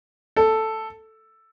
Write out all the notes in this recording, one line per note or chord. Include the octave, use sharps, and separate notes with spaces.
A4